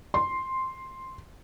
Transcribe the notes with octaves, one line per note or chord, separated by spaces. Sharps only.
C6